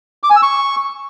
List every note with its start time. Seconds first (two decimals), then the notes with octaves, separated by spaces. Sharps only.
0.23 D6
0.30 G#5
0.36 E6
0.43 C#6